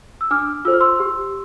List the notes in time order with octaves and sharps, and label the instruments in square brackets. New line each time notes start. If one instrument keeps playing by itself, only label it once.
[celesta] E6
D4 D6 F6
F4 A4 C5 E6
F6
C6 E6
G4